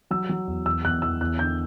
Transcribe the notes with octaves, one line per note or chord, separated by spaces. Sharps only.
F#3 E6
F#3
E2
E2 E6
E2 F#6
E2 E6
E2 F#6
D3 G6